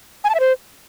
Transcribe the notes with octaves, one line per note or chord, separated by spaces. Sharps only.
G#5
A5
E5
C5